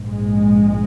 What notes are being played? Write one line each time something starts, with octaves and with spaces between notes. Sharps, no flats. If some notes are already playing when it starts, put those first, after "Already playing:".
Already playing: A#1 G#2
G#3